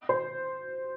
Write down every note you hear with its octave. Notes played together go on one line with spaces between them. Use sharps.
C5